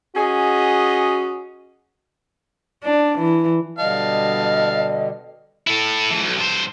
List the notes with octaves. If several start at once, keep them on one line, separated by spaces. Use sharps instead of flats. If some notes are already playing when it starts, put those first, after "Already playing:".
C#4 F#4 G#4 D#5
D4
E3
B2 D3 G3 D#5 F5 A5
E4 A4
G#2 E3
B1
G2 C5